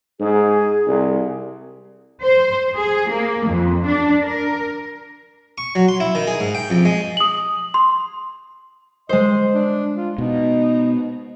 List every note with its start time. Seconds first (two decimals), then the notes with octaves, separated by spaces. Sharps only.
0.20 G#2 G#4
0.87 C2
2.22 C5
2.76 G#4
3.11 A#3
3.48 F2
3.86 D4
4.24 A#4
5.58 C#6
5.75 F#3
5.88 C6
6.00 E4
6.15 D#3
6.27 G#4
6.40 G#2
6.55 G5
6.70 F2
6.85 G#3
7.17 D#6 F#7
7.74 C6
9.09 G#3 C5 D#5
9.54 D4
9.95 F4
10.18 B2 D#4